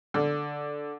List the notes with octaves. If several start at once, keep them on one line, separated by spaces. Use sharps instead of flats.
D3